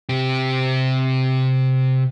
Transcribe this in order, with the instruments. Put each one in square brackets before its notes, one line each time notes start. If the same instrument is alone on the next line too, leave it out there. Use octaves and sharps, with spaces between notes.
[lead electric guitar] C3 G4